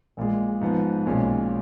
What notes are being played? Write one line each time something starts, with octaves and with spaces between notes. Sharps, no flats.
A#1 A#2 G#3
G#2 F3 B3
B1 A#2 G#3 C#4